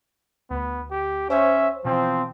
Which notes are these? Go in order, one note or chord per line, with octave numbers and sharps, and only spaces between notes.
D2 B3
G4
C#4 C5 C#5 E5
B2 E3 F3 C4